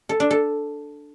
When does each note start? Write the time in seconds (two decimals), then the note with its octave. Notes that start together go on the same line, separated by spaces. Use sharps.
0.09 A4
0.20 D4
0.31 A4